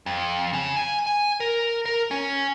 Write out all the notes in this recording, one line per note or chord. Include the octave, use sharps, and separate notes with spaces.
F2
C#3
G#5
G#5
A#4
A#4
C#4